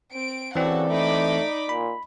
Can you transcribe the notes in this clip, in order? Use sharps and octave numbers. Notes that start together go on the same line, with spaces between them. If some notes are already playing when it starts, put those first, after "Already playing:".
C4 D7
C#3 E3 C4 F#4 A4 D5 F#5
A3 D#4 B5 D6
A#2 B5